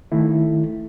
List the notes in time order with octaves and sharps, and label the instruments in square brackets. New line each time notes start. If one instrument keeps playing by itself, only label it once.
[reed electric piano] D#3 A3 E4